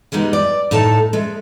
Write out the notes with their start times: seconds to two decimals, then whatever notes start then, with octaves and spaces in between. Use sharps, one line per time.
0.12 G3 G#3 B3 D#4
0.33 D5
0.71 A2 D#4 A4 A5
1.13 G#3 A3